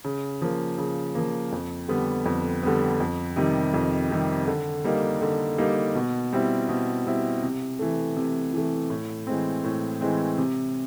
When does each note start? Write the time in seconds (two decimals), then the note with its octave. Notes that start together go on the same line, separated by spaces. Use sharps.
0.05 C#3
0.42 F3 A#3
0.78 C#3
1.15 F3 A#3
1.52 F2
1.89 D3 G3 B3
2.26 F2
2.63 D3 G3 B3
3.00 F2
3.36 C3 D#3 G3
3.74 F2
4.11 C3 D#3 G3
4.47 D3
4.84 G3 A#3 D#4
5.22 D3
5.58 G3 A#3 D#4
5.95 B2
6.33 G3 C4 E4
6.69 B2
7.06 G3 C4 E4
7.43 C3
7.79 E3 A3
8.17 C3
8.53 E3 A3
8.90 A2
9.27 E3 G#3 C4
9.64 A2
10.01 E3 G#3 C4
10.38 C3